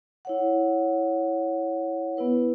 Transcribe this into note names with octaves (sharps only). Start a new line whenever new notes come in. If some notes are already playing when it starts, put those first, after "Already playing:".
E4 C#5 F#5
B3 E4 B4